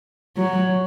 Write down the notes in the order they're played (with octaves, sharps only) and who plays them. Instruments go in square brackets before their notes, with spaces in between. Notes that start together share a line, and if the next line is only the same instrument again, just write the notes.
[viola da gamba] F#3